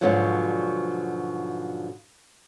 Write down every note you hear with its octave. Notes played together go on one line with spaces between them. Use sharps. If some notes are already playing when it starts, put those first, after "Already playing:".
G#2 B2 D3 F3 F#3